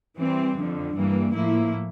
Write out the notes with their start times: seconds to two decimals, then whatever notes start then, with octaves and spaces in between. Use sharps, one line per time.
0.18 E3 G3 C4
0.56 F2 D3 F3
0.95 G2 E3 G3 A#3
1.34 A2 F3 A#3 E4